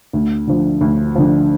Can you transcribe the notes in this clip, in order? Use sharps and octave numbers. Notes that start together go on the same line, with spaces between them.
D2
D3 F3
D2
D3 F3